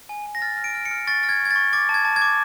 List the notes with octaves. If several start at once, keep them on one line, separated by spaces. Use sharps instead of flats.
G#5
G#5
A#6
F6 A6
F6
D7
F6
C#7
F6
C#6 A6
F6 A6
G#6
C#6
G#6
A6
C#6
D6 A6
A5
G#6
A5
G#6
D6